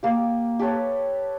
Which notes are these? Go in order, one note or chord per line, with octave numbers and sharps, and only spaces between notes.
A#3 G4
G4 A4 B4 C#5